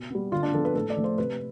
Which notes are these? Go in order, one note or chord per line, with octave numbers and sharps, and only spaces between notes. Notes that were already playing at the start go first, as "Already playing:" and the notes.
Already playing: B2
G3 B3
D3 F4
D4
F3 B3 A4
B4
A2 A4
D5
F3 A3
C5
C3 B4